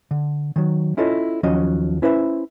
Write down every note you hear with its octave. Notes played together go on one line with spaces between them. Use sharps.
D3
D#3 F#3
C#4 E4 F4 A4 C#5 D#5
D#2 F3 F#3 C#4 F#4 D#5
C#4 E4 B4 C5 D#5 E5